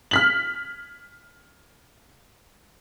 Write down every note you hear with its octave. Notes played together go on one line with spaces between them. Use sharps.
F6 B6 F#7